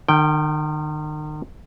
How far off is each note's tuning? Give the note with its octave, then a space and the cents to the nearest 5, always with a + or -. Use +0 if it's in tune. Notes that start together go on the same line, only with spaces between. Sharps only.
D#3 -40 G5 -5